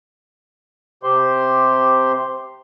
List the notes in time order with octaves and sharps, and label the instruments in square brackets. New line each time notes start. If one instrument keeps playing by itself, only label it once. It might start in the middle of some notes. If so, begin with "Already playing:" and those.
[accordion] C3 G4 C5 C6